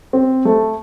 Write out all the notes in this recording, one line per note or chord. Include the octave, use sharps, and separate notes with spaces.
C4
A3